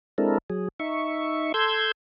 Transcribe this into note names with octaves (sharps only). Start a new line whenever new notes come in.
G#3 C4 D4 E4 A4 A#4
F#3 G#4
D#4 E5 C#6
A4 C6 E6 G6 G#6